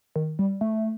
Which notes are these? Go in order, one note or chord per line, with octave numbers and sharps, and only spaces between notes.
D#3
G3
A3